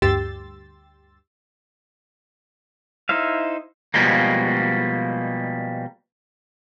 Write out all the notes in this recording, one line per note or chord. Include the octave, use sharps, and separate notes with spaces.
D2 G2 G4 C6 E6 A6
D#4 E4 C5 E5 F5
B2 F3 G3 G#3 A#3